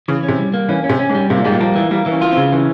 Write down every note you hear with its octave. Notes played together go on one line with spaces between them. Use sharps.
C#3 E3
C#4
C3
G3
A#3
E3 C#4
C#4
C3
C#4
G#2
G3
C3 A#3
A#2
G#2 G3
A#2
F3 A#3
E3
G3 A#3
E3
C#4
F4
C4
C#3
E3 C#4